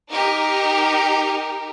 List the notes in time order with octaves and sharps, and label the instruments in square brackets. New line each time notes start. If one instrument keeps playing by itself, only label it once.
[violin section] D#4 G4 A#4